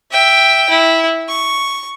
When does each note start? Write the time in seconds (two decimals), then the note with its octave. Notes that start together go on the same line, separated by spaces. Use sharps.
0.11 E5 G5
0.70 E4
1.29 C#6